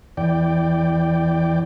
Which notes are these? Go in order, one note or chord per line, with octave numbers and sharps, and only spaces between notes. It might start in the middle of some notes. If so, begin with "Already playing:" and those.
E2 D5 G5